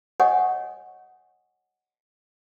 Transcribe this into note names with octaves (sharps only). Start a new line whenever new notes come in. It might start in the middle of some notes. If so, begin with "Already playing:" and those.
C#5 D#5 F#5 G#5 C#6 D#6